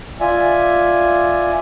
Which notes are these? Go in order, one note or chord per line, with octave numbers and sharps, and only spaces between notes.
F4 D5 E5 G#5